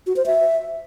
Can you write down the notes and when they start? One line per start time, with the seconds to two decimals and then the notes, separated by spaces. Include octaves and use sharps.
0.07 F#4
0.16 C5
0.26 E5